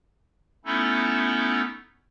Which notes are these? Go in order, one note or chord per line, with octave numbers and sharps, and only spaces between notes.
A3 B3 C#4 D#4 E4 A4